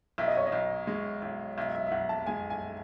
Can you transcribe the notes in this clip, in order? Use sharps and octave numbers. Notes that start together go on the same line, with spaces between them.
B1 E5
D#5
C#5
D#5
B1
G#3
B1
B1 E5
E5
E5
B1 F#5
A5
G#3 G#5
G#5